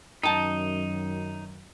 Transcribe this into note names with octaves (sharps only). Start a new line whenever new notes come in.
F#2 D#3 D#4 G5 A5